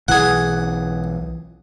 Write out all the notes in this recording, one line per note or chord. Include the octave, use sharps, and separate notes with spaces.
B1 E3 G#4 F#5